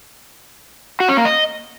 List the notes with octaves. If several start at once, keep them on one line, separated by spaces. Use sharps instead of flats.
F#4
C#4
A#3
D#5